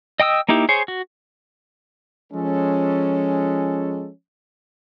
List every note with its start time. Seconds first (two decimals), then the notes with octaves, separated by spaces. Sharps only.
0.20 D#5 G5 D#6 E6
0.49 A#3 D#4 E4 G4
0.69 G#4 C5 C#5
0.88 F#4
2.33 F3 G#3 C#4 A4